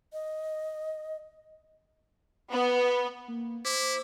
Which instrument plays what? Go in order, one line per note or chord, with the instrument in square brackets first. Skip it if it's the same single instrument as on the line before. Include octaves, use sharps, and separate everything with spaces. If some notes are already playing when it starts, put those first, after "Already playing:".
[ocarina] D#5
[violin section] B3
[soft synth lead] A#3
[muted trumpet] E4 [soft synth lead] C5 [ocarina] D6